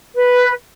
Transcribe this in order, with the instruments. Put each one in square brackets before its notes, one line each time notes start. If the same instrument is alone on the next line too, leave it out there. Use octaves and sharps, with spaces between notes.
[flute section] B4